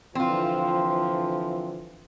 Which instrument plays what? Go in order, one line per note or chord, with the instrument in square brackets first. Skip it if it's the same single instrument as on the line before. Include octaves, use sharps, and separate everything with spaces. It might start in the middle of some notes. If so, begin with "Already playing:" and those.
[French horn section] D3 E3 F3 [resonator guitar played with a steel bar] C4 F4